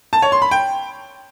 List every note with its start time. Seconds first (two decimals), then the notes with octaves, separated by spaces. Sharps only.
0.13 A5
0.22 C#5
0.32 C6
0.42 B5
0.51 G5